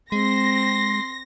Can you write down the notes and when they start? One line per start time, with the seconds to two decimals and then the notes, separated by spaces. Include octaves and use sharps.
0.12 G#3 C4 C6 A#6